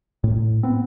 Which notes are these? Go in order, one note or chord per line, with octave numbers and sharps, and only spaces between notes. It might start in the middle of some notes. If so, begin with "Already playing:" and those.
A2
B3 C4